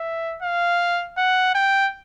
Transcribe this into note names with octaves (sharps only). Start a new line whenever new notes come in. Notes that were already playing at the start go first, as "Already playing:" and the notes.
Already playing: E5
F5
F#5
G5